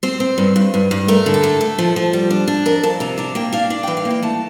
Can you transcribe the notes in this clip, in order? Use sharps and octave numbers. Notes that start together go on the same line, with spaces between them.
C4 C5
C4
G2
G2
G2
G2
A3 A#4
D3
A4
A3
A3
F3
F3
G3
D4
D4
F2 A#4
F2 A5
C3 A#5
D4 A#5
A#3 G5
D4 F5
D4 F5
G5
E3
F5
A#3
G5
A3 A5